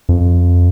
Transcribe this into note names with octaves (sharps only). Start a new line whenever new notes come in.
F2